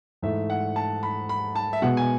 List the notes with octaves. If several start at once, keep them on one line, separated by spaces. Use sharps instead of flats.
G#2 E3 A3 E5
F#5
A5
B5
B5
A5
E5
B2 G#3 B3 F#5
G#5